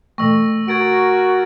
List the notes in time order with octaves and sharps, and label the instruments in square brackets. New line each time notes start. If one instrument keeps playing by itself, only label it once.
[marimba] B2 E3 A3 [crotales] C#6 E6 A#6
[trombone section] F#4 A#4 [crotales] G#6 A6 D7